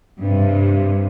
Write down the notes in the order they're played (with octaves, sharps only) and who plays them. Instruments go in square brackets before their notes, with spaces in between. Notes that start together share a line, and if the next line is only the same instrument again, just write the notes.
[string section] G2 C3